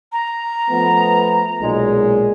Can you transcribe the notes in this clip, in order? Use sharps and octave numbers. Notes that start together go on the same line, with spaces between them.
A#5
F3 A3 B3
B1 A#2 G#3